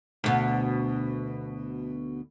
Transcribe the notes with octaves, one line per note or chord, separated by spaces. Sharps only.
D2 B2